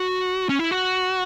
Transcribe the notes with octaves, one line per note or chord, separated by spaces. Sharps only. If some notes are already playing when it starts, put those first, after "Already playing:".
Already playing: F#4
C#4
E4
F#4